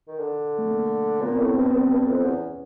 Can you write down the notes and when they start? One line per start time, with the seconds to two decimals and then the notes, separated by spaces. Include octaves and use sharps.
0.07 D#3
0.19 D3
0.58 A3
0.71 A#3
1.21 A#2 B3
1.32 C4
1.39 A2 B3
1.51 C4
1.56 G2 B3
1.71 G2 C4
1.81 B3
1.91 G2
2.07 F2
2.24 E2 C#4